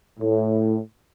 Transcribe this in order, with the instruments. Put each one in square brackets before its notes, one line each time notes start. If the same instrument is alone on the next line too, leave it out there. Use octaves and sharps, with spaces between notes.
[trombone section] A2